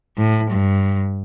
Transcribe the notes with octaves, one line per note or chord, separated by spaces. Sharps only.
A2
G2